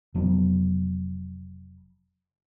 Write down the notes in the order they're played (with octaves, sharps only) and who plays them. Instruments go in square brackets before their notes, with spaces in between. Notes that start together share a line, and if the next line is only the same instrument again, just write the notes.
[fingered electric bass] F1 F#3 B3